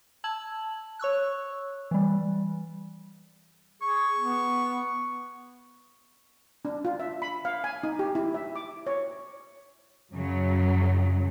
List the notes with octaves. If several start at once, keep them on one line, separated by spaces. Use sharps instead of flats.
A5 E6 G#6 F#7
C#5 C#6 E6 F#6
E3 G3
G#4 C#6
B3
D4
F4
E5
B5
F5
G#5
D#4
G4
E4
E5
D6
C#5
F#2 C#3 F#3